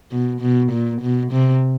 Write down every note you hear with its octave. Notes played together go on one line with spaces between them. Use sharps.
B2
B2
A#2
B2
C3